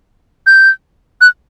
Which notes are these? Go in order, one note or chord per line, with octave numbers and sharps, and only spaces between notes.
G6
F#6